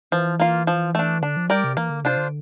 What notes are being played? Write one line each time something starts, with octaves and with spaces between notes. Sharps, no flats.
E3 F3
A#3 F4
F3
A3 D4
D3 D4
F3
G3 G4 A#4 D5
C3
E3 A#3
D3
C3 D4 F4 C5
D3